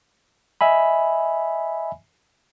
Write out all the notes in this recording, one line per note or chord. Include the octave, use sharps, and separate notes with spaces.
D#5 E5 G#5 B5